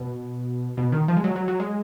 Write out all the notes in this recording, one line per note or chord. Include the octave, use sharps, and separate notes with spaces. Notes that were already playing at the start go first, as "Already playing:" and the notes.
Already playing: B2
B2
D#3
F3
G#3
F#3
F#3
F#3
G#3